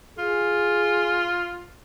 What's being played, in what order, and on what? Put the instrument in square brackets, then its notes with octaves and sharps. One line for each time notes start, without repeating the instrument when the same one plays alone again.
[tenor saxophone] F4 [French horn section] G#4